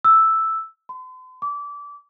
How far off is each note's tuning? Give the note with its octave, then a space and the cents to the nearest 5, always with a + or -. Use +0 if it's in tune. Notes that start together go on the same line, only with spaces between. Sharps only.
E6 +0
C6 -45
D6 -25